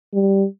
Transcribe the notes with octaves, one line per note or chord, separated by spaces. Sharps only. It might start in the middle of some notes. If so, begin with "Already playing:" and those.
G3